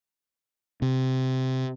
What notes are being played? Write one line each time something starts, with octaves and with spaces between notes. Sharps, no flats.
C3